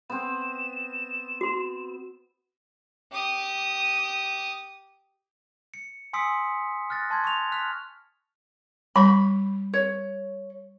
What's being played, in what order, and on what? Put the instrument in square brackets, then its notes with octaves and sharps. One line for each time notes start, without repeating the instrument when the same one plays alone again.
[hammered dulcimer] B3 C4 [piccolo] E7
[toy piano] F#4 C6
[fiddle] G4 D#6
[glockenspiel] C#7
G#5 C6 D#6 E6 B6 C#7
F6 F#6 A6 A#6
A5 C6 G#6
C#6 F7
F6 F#6 B6 F7
[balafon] G3 C#6 [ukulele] B5
[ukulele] C#5